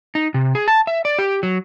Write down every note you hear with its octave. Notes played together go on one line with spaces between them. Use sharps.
D#4
C3
G#4
A5
E5
D5
G4
F#3